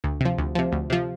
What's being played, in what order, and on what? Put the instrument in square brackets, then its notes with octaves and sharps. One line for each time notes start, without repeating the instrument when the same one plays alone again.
[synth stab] D2
C3 F3
D2
C3 F3
D2
C3 F3